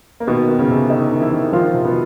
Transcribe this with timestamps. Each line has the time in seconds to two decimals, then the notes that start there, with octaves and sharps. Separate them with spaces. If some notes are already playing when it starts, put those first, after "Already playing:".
0.20 A#3
0.27 B2 D#3 B3
0.49 D#3
0.59 C#3 C#4
0.70 C3
0.90 D#3 D#4
1.11 D#3
1.21 E3 E4
1.32 D#3
1.52 D#3 F3 F4
1.74 C3
1.85 B2 B3